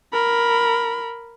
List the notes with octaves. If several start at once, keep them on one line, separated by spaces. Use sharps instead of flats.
A#4 B5